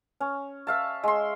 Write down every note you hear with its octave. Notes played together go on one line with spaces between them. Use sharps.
C#4
E5 F5 A5
G#3 C6